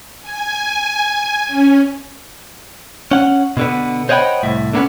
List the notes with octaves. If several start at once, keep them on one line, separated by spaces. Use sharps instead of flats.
G#5
C#4
C#4 F#5
B2 D3 B3
C5 C#5 D#5 F#5 G5 B5
C2 A2 E5
D3 A#3 B3 C#4